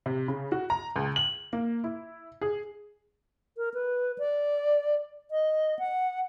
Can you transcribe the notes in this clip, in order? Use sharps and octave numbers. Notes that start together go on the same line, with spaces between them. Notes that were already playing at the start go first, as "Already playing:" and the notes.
C3
C#3
F#4
A#5
C#2
F#7
A#3
E4
G#4
A#4
B4
D5
D#5
F#5